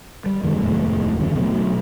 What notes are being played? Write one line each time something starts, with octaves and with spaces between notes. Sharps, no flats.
G3
F#2 D#3 G#3 A3
F1 D#2 A2 G#3
F#2 D3 F3 C4
B2 F#3 A3